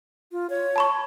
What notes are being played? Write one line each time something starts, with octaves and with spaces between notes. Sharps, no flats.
F4
C#5
A5 B5 C#6